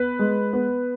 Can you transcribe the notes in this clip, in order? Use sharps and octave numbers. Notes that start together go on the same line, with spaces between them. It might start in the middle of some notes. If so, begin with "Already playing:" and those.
Already playing: B3 B4
G#3
B3